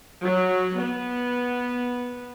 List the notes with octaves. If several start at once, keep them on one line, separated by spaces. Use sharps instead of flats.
F#3
B3